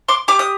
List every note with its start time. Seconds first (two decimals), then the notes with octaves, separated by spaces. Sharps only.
0.08 C6 D6
0.28 G4 D6
0.39 D#6